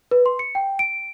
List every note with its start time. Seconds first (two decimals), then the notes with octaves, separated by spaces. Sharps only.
0.11 B4
0.26 C6
0.39 C#7
0.55 G5
0.79 D7